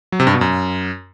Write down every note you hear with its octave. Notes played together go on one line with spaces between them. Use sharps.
F#3
C3
G2
B2
F#2